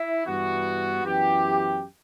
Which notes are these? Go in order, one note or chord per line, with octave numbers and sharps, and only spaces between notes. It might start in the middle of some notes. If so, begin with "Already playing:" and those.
Already playing: E4
G2 E3 B3 F#4
F#2 E3 B3 E4 G4